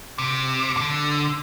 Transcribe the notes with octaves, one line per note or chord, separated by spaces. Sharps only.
C3
D3